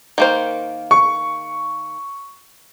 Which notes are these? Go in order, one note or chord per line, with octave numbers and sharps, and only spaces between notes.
D#3 A#3 C5
C#6